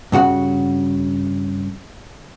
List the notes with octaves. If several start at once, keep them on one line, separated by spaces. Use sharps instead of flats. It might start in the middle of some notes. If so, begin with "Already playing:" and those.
G2 C#3 F#4 F#5